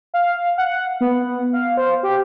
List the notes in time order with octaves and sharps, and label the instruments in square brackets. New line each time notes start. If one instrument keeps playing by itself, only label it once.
[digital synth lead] F5
F#5
B3
F5
C5
G4